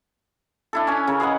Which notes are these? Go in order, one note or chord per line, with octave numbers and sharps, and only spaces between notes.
D4 E4 A4
C#4 G#5
C#3 A#4
G#4 B4 D#5 F#5